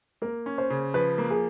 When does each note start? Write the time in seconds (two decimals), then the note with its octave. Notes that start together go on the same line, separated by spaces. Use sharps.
0.22 A#3 A#4
0.46 C#4
0.58 C5
0.70 C#3
0.94 F3 B4
1.18 A#3
1.30 G#4